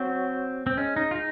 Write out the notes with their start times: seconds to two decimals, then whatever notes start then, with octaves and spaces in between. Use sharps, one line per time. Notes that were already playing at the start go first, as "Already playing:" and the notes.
Already playing: F#3 C4
0.67 C4
0.78 G#3 C#4
0.96 D#4
1.11 F4
1.15 D#4